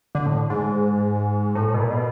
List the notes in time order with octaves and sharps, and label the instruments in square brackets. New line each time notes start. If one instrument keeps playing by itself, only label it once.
[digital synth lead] D3
A2
G#2
A2
A2
B2
A#2
B2